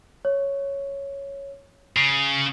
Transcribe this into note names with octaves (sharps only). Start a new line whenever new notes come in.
C#5
C#3 C7